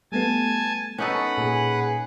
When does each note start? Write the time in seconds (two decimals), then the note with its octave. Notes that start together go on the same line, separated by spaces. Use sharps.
0.12 G3 A3 B3 G#5 A5
0.98 C#4 D#4 A4 B4 F#5
1.38 A#2 G#4